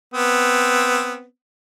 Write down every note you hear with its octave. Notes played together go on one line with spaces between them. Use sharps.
B3 C4